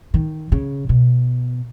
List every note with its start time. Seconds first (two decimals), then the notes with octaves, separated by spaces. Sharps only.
0.14 D#3
0.52 C#3
0.89 B2